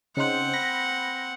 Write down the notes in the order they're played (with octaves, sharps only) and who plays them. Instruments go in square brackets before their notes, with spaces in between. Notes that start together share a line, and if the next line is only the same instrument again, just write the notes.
[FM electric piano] C#3 D#4 C5 [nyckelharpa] C4 F#5
[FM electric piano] B5 A#6